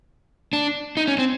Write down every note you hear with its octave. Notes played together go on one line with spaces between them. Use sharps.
D4
D#4
C#4
C4